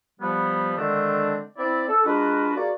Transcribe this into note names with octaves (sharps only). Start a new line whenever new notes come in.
F3 G3 B3
D3 D#3 G#3 A3 C4 D4
C4 E4 D5
A4
G#3 D4 F4 F#4 A#4 B4
A#3 F#4 G#4 D5